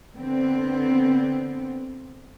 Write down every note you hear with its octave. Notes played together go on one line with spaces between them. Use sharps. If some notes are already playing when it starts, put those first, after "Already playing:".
D3 B3 C4